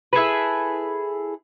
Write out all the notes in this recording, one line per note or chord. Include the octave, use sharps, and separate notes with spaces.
E4 G#4 A4 B4